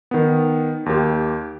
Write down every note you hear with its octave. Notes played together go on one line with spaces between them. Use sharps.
D#3 B3
D#2 G4